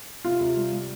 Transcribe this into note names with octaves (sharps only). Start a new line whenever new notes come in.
C3 F4
C3
G3
G3